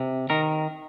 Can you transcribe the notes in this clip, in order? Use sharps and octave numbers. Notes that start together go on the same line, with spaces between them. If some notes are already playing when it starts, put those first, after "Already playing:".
Already playing: C3
D#3 A#4